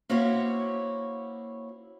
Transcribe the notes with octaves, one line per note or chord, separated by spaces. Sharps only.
A#3 C#4 E4 F#4 C5 C#5